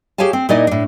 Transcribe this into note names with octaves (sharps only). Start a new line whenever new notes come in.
G4 G#4 C#5 F5 G#5 A5
C4
A#2 D#4 E4 D5 D#5
A2 D4